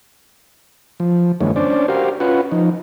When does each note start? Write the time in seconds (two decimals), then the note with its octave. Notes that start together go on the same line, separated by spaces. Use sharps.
1.00 F3
1.41 F#2 D3 E3 G#3 A#3 C#4
1.56 C#4 D4 C5 D5
1.88 F#4 G4 A#4 C5 F5
2.20 C#4 F4 B4 F#5
2.52 F3 D#4